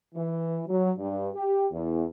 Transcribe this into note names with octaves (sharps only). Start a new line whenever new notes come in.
E3
F#3
G2
G4
E2